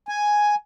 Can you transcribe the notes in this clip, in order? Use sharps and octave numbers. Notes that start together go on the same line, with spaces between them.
G#5